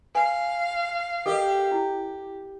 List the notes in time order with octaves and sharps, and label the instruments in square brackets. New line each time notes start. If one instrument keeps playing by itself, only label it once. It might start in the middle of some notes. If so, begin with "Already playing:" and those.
[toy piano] B4 G#5 [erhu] F5
[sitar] G4 [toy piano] A4 A#4 D#5
[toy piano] E4